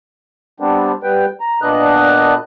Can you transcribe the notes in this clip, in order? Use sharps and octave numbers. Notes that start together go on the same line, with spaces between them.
G3 B3 C4 D4
G3 B3 B4 G5
A#5
A#2 B3 D4 D#5 F#6